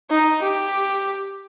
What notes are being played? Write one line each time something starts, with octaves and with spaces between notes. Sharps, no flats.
D#4
G4